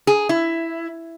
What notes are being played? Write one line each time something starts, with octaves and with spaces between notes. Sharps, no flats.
G#4
E4